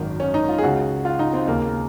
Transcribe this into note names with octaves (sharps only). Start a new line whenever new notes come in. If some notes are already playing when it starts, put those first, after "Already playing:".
Already playing: G#1 F#2 D#3
C#4
D#4
F4
G#4
C#2 C#3 F#4
F4
D#4
C4
D#2 C#3 A#3
A#3